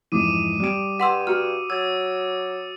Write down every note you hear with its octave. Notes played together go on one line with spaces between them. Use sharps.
F2 G#2 E3 D6 D#6 D#7
G3 D7
G2 F#5 C6 E6
F#4 A#5 E6 F6 C#7
F#3 E6 G#6 A6